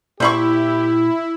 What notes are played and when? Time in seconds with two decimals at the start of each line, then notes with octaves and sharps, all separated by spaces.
0.20 A#2 E4 G4 C5 B5 C#6